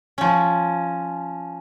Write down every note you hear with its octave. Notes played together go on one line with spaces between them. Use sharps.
F3 C#4